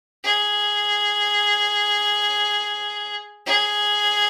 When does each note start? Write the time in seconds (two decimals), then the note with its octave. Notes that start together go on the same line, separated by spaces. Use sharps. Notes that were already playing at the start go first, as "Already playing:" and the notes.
0.24 G#4
3.46 G#4